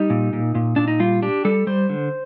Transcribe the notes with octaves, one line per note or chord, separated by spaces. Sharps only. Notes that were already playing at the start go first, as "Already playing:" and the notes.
Already playing: G3 D#4
A#2
A#2
A#2
A#2 D4
D#4
G3 F4
D4 G4
G3 A4
G3 C5
D3